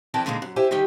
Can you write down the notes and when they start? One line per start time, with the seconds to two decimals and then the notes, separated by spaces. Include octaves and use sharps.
0.14 F2 E3 A#4 D5 G5 A5
0.26 A#2 D3 D#3 G#3 A#3
0.42 F#2
0.56 E4 G4 C5 E5 G#5
0.71 D3 D#3 G3 G4